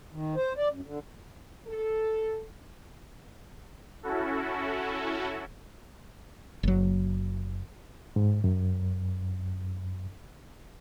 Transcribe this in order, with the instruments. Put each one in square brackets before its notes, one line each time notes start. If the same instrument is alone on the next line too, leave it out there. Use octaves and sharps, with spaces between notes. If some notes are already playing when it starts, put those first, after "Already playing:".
[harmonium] D#3
C5
D5
F#2
D3
[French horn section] A4
[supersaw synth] C#4 E4 F#4 A4
[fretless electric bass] F#1 F#3
[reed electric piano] G#2
F#2